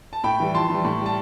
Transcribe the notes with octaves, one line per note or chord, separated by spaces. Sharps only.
A5
A2 G5 B5
E3 G3
F2 A5 C6
E3 G3
A2
G3
A5